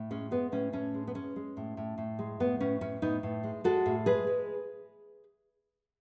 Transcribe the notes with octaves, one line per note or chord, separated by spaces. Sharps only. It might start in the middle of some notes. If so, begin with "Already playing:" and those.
Already playing: A2
G#3 C#4
G#3 B3
A2 C#4
A2 C#4
G#3
B3
G#3 C#4
G#3
A2
A2
A2
G#3
A2 B3
A2 C#4
A2 C#4
A2 B3 D#4
A2
G#3
G#3 F#4 A4
A2
G#3 G#4 B4
G#3